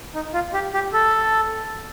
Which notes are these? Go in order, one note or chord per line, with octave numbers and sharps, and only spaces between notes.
D#4
F4
G4
G4
A4